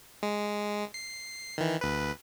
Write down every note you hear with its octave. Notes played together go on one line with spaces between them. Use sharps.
G#3
C7
D#3 E3
D2 B4